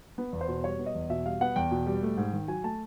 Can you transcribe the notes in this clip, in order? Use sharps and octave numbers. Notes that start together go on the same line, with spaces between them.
B3
E2
C5
B2
G3 C#5
B3
D#5
E2
B2 E5
G3 F5
B3 F#5
E2 G5
B2
G3
A3
G#2
D#3
F#3 G#5
A3 A5